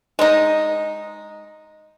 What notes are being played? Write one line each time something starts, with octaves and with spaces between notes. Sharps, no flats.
G#3 D#4